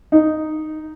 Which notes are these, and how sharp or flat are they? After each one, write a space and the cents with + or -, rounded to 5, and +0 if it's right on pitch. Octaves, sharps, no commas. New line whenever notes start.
D#4 -5